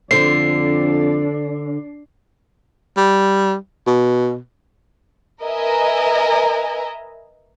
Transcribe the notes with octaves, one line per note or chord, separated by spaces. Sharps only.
F2 D3 D4 C5 C7
G3
B2
A#4 B4 D#5 E5 G#5 A#5